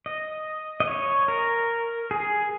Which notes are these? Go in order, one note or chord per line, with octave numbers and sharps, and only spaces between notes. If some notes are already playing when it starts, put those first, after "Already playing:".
D#5
D#5
C#5
A#4
G#4